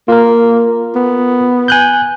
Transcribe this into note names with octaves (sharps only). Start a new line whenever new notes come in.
A#3 F4 A#4
B3
G#5 F#6 G6